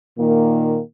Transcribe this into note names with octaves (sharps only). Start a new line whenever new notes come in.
A#2 D#3 A#3